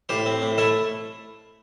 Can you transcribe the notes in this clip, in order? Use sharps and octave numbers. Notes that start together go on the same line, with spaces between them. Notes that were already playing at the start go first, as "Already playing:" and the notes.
A2 G4 C5
C4
A2
A3 E4 A4